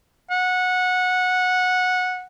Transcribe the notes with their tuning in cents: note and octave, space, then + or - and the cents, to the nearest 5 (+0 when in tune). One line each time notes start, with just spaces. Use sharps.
F#5 -15